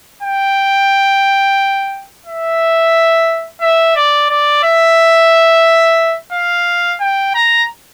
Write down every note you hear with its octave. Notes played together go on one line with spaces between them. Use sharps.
G5
E5
E5
D5
D5
E5
F5
G5
A#5